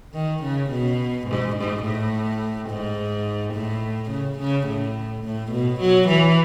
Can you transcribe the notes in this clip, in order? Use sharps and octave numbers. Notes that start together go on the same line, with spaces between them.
D#3
C#3
B2
G#2
G#2
A2
G#2
A2
C#3
C#3
A2
A2
B2
F#3
E3